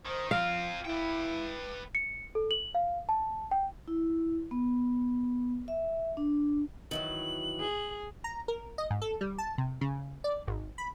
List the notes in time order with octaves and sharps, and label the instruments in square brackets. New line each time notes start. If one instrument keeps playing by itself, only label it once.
[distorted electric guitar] D#3 [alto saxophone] C5
[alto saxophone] F3 [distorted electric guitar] C4 F4 [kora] F5
[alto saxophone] E4 [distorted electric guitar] B4 G5
[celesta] C#7
A4
F#7
F5
A5
G5
[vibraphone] E4
B3
E5
D4
[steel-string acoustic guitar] D#3 E3 F#3 [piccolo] F#7
[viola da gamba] G#4
[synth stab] A#5
A#4
D#5
G#2
A4
G3
A5
C3
C#3
D5
G#1
B5